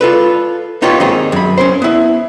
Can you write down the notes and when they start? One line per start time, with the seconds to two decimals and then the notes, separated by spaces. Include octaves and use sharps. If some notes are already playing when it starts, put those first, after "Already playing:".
0.01 F4 A4 B4
0.82 B3 D#4 F4 G4 C#5
1.00 D#3 G#3 A#3 C4 D#4
1.32 F#2 B5
1.58 C#4 A#4 C5
1.82 B3 E4